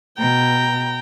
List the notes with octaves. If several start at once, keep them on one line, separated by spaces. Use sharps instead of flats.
B2 G5 A#5